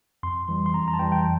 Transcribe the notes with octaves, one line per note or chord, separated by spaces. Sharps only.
F2 C6
E3 G3
C6
F2 A#5
A#5
A5
E3 G3 G5
G5